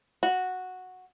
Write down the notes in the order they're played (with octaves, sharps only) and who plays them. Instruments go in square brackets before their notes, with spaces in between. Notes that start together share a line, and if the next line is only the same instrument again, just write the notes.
[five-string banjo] F#4